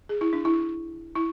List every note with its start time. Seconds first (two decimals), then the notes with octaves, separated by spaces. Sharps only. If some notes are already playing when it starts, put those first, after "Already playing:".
0.09 G#4
0.21 E4
0.33 D4
0.45 E4
1.15 E4